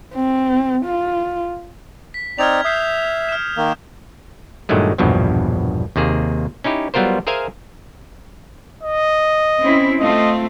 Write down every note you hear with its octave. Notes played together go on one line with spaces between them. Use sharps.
C4
F4
B6
C4 D#4 D5 F6 G#6 F7
E5 D#6 G6 C7
F6 E7
D#3 A#3
G2 A#2 D#3 F#3 G#3 A3
A#1 E2 G2 B2 F3 F#3
D#2 C3 A#3 G#4
C#4 D#4 E4 G4
F#3 G3 B3 F4 A#4 C5
G#4 A#4 C5 E5 F5 G#5
D#5
C4 C#4 E4
A3 C4 F4 D#5